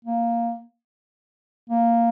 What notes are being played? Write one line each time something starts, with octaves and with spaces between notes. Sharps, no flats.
A#3
A#3